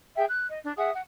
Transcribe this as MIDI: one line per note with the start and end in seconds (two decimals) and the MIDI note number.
0.16 0.24 68
0.16 0.24 76
0.16 0.24 79
0.27 0.45 90
0.48 0.59 75
0.65 0.73 62
0.78 0.90 68
0.78 0.90 76
0.78 0.90 78
0.78 0.90 87
0.93 1.01 78